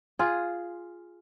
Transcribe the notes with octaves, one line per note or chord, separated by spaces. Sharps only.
F4 G#4